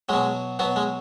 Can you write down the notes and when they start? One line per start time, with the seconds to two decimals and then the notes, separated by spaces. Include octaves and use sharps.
0.09 B2 F#3 G#3
0.59 B2 F#3 B3
0.76 G#3